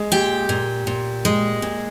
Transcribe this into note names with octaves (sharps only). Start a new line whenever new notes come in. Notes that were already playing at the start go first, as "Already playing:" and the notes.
Already playing: G#3
A#2 G4 G5
A#2
A#2
G#3
A#2